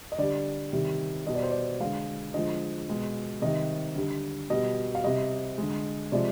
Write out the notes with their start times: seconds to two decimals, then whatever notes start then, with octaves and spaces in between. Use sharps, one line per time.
0.12 D#5
0.18 D3 G3 D5
0.73 C3 D#3 G3
1.26 B2 G3 D#5
1.35 D5
1.43 C5
1.51 D5
1.80 D3 G#3 F5
2.34 D3 F3 G#3 D#5
2.88 B2 G#3
3.42 C3 D#3 G3 D#5
3.96 D3 G3
4.50 B2 G3 D#5
4.95 F5
5.04 C3 G3 D#5
5.58 D3 G#3
6.12 C3 F3 G#3 D5